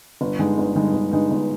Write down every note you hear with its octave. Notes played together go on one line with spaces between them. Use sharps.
G1
G2 D3 G#3 D#4
G1
G2 D3 G#3 D#4
G1
G2 D3 G#3 D#4
G1